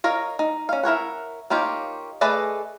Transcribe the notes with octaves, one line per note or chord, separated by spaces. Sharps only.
A#4 C#5 D#5 F5
D#4
C#4 F5
E4 A#4 C#5 F#5
A#3 D#4 F4 G4 C#5
A3 G#4 B4 D5 D#5